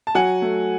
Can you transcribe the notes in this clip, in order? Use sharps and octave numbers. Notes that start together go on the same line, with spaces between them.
A5
F#3 F#5 G#5
A3